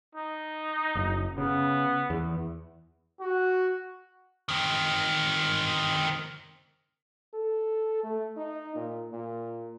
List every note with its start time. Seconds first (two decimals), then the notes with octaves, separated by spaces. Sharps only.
0.15 D#4
0.95 F#1
1.38 C#3 B3
2.10 E2
3.21 F#4
4.49 D#3 C4
7.34 A4
8.03 A3
8.37 D#4
8.75 A#2
9.12 A#2